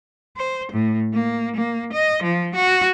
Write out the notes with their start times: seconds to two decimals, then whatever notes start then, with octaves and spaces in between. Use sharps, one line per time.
0.37 C5
0.72 A2
1.13 A#3
1.56 A#3
1.93 D#5
2.23 F3
2.55 F#4